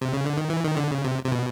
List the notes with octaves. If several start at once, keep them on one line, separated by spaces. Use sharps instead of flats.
C3
C#3
D3
D#3
E3
D#3
D3
C#3
C3
C3
B2